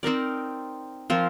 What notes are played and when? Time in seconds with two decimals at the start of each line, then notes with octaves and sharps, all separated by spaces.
0.03 C4 D#4 A#4 D5
1.10 F3 C4 F4 A#4